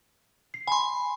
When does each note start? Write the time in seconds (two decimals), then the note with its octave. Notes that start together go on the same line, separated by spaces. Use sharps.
0.54 C7
0.67 G#5 B5 C6